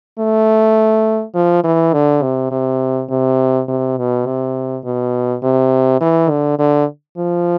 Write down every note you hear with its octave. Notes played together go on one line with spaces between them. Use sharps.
A3
F3
E3
D3
C3
C3
C3
C3
B2
C3
B2
C3
E3
D3
D3
F3